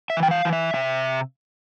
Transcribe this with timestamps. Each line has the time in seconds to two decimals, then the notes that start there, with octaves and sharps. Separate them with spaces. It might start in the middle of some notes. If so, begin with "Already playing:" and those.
0.10 E5
0.17 E3
0.23 G5
0.31 F5
0.45 E3
0.53 E5
0.74 C3 E5